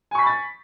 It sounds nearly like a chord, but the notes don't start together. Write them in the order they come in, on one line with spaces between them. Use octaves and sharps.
G#5 C#6 B6 B5 A6